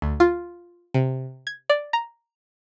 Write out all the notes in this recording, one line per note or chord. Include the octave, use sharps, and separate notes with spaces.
D2
F4
C3
G#6
D5
A#5